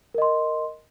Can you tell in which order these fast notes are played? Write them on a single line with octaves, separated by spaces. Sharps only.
A#4 D#5 C6